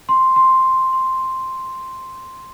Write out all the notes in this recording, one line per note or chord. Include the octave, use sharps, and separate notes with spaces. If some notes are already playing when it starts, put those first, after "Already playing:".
C6
C6
C6